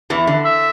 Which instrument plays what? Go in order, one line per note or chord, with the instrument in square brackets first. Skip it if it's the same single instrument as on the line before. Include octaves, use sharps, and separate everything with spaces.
[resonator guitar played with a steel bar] E2 E3
D3
[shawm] E5